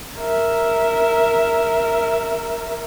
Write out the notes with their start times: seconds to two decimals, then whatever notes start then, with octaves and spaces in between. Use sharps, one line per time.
0.18 A#4 E5